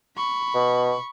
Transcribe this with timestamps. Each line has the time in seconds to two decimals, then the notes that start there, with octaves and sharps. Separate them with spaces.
0.17 B5 C#6
0.55 B2